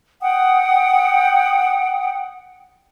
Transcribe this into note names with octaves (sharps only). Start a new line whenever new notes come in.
F#5 G5 D#6